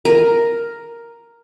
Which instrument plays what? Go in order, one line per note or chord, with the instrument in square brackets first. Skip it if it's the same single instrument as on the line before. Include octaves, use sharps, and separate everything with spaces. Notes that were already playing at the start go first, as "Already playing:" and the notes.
[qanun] A#4